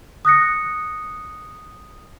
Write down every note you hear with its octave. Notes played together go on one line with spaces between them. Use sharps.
D#6 F#6 A#6 C#7